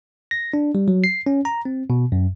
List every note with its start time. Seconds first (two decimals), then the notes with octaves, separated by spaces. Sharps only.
0.31 A#6
0.54 D4
0.75 G3
0.88 F#3
1.04 C7
1.26 C#4
1.45 A#5
1.65 C4
1.90 B2
2.12 F#2